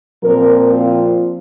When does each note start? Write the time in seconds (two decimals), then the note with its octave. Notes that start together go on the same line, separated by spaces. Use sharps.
0.23 A#2 F3 C4 A#4
0.70 F4